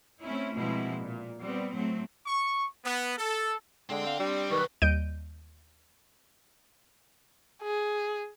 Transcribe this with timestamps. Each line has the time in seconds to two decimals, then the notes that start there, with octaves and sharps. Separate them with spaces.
0.23 A3 C4 C#4 E4
0.55 B2 F3 G#3 A#3 C4 E4
1.03 A#2
1.41 G3 B3 C4
1.73 A2 F#3 A3 C4
2.26 C#6
2.85 B3
3.18 A4
3.90 D3 G#3 C4 G5
4.07 F5
4.19 G3 D4
4.51 B1 D#3 B4 C#6
4.82 D#2 G3 D#5 G6 D7 D#7
7.63 G#4